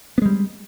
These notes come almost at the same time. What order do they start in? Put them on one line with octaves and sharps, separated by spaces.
B3 G#3 G3